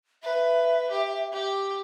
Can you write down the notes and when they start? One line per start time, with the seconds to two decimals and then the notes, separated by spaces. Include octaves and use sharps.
0.23 B4 E5
0.90 G4
1.32 G4